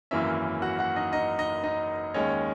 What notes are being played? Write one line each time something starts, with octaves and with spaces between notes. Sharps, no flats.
G#1 F#2 E3 A#3 C#4 E4 E5
F#4 F#5
F#4 F#5
D#4 D#5
D#4 D#5
D#4 D#5
D#4 D#5
D#2 D#3 G#3 C#4 C#5